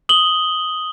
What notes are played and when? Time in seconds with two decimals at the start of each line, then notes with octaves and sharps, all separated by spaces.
0.09 D#6 F#7 G7